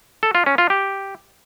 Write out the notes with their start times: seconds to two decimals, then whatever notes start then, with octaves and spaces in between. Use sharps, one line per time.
0.23 A4
0.35 F4
0.46 C#4
0.58 F4
0.70 G4